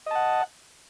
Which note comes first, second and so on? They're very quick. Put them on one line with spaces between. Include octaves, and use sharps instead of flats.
D#5 A5 F#5